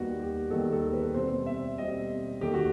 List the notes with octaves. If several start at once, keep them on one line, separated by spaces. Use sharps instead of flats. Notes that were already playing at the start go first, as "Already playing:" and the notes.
Already playing: D#2 D#3 G3 B3 F#4
G4
D#2 D#3 G3 B3 A4
A4
B4
B2 G3 C4 C5
E5
B2 G3 C4 D#5
D#2 D#3 A3 G4
F#4